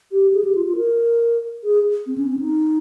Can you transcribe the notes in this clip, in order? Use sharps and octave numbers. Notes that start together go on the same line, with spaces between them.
G4
G#4
G4
F4
F4
A#4
G#4
C4
C#4
C4
D#4